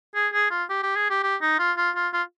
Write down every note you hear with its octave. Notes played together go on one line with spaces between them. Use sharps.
G#4
G#4
F4
G4
G4
G#4
G4
G4
D#4
F4
F4
F4
F4